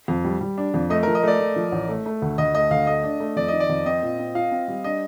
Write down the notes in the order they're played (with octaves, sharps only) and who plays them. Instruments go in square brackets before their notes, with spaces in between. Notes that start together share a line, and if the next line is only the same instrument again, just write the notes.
[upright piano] F2
G3
G3
D4
F2
[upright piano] A3 [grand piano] D#5
[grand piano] A#4
[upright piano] F3
[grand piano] D#5
[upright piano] A3 [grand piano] D5
[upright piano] A3
F3
A1
A3
A3
D2
[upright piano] D2 [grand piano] D#5
[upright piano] A3 [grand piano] D#5
[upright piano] D2 [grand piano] F5
[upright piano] A3 [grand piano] D#5
[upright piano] D4
A3
[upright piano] F2 [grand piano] D5
[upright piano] D#3 [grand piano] D#5
[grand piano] D5
[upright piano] F2
[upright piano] C4 [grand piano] D#5
[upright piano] A#2
C4
[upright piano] F4 [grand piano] F5
[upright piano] C4
G3
[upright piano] D4 [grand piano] D#5